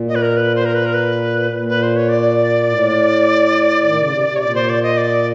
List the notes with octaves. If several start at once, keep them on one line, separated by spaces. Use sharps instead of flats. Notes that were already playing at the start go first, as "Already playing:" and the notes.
Already playing: A#2
D#5
B4
A#4
B4
C5
A#4
B4
A#4
B4
A#2
B4
C5
C#5
D5
A2
D#3
C#3
C3
C3
C#5
A#2 D5
C5
D5
D#5
D5